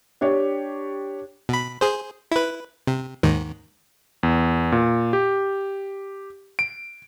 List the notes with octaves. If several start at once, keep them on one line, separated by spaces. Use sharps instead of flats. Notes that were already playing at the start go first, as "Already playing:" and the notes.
D4 G4 C#5
B2 B5
G#4 C5
E4 B4
C3
D#2 G#2 D#3
E2
A#2
G4
D7